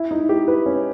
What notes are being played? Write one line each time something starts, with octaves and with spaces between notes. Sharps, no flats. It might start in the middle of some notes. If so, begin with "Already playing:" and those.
Already playing: E4
D#4
G4
B4
C#4